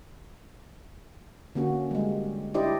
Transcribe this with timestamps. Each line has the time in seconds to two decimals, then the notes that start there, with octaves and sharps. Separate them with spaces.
1.55 D3 A#3 C#4 F#4
1.91 G3 G#3
2.54 D4 E4 G4 C5 D5 D#5